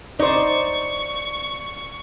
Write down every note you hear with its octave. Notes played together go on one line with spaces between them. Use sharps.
D#4 C5 D5 C#6